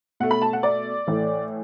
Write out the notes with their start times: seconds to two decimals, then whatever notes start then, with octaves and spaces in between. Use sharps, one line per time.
0.20 B2 A3 F#5
0.31 B5
0.42 A5
0.53 F#5
0.63 D5
1.07 A2 E3 A3